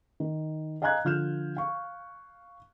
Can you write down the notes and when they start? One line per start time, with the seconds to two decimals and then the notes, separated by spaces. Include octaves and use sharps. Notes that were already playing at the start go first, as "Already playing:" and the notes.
0.20 D#3
0.82 D#5 F5 G#5 A#5 F#6 G#6
1.05 D3 F3 F6 G6 E7
1.57 F5 C#6